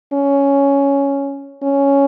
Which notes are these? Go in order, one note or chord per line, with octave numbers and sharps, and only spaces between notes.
C#4
C#4